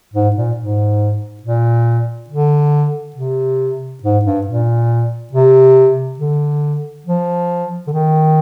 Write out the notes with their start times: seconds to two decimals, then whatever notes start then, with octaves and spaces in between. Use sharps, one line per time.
0.14 G#2
0.36 A#2
0.57 G#2
1.43 A#2
2.30 D3
3.16 C3
4.03 G#2
4.25 G2
4.47 A#2
5.33 C3
6.19 D3
7.07 F3
7.87 D3
7.93 D#3